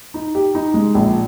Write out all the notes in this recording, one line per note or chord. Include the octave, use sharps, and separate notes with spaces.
D#4
G4
D#4
G#3
A#1